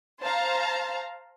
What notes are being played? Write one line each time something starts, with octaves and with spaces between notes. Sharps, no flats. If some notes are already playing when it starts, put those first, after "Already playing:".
C5 F5 A5 A#5